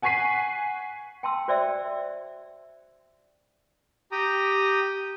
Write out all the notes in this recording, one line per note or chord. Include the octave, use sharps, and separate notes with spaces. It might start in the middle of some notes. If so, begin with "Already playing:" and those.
F#5 G#5 C#6 B6 C7 D#7
G5 A5 C6 E6
F#4 C5 D5 E5 G5 E6
G4 G5 A#5 D#6